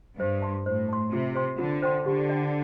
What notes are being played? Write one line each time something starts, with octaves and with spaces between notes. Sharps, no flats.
G2 C5
A5 C6
A2 C5
A5 C6
C3 F4
C5 G5 C6
D3 F4
C5 G5 C6
D3 G4
D5 G5